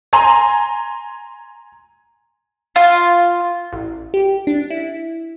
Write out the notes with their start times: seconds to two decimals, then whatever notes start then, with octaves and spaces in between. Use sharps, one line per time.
0.13 G#5 A#5 C6
2.76 F4
3.72 A1
4.14 G4
4.47 D4
4.70 E4